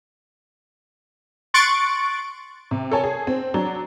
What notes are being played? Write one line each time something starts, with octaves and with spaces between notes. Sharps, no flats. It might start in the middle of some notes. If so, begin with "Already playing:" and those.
C6 C#6 F#6 A6 D7
C3
A4 A#4 C#5 G#5 A5
G#4
C4
F#3 D4